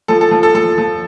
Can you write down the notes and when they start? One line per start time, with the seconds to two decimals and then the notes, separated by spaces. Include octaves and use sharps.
0.08 F3 A4
0.21 A4
0.31 F3 A4
0.43 A4
0.55 F3 A4
0.78 F3